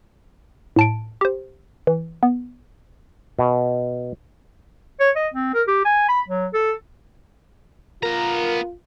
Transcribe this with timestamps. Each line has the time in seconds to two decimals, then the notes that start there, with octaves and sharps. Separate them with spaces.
0.76 A2 A5 D7
1.21 G4 C5
1.87 E3
2.23 B3
3.39 B2
5.00 C#5
5.16 D#5
5.34 C4
5.54 A#4
5.68 G4
5.85 G#5
6.09 B5
6.28 F#3
6.54 A4
8.03 B3 F4 A#4 A#5